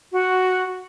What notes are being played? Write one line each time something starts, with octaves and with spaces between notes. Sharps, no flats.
F#4